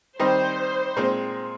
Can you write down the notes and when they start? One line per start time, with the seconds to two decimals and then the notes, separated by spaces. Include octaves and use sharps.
0.19 D#3 G3 C4 D#4 C5
0.96 A#2 G#3 C4